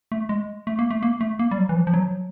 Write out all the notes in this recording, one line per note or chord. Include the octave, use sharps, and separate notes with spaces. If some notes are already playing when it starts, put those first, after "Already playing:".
A3
G#3
A3
A#3
A3
A#3
A3
A#3
G3
F#3
E3
F3
F3
F#3